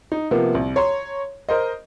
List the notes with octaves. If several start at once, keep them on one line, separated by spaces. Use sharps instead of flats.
D#4
C3 F3 A#3 B3
C2
C#5 A#5 C6
A#4 C5 D#5